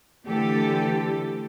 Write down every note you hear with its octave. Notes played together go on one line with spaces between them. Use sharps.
D3 E3 A3 G4 A4